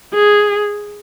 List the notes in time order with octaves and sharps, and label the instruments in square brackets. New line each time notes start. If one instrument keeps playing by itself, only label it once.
[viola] G#4